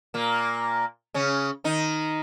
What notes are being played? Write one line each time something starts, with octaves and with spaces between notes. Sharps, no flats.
A#2 A#3
C#3 C#4
D#3 D#4